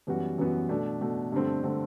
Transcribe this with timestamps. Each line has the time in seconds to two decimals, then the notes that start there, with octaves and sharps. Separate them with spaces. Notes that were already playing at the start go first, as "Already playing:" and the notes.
0.07 F#2 E3 G3 B3 F#4
0.38 F#2 E3 G3 B3 F#4
0.69 B2 A3 D4
1.01 B2 A3 D4
1.32 G2 D3 A3 C4
1.64 D3 A3 C4